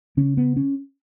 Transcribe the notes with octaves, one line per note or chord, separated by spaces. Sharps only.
C#3 C#4
B3
C#4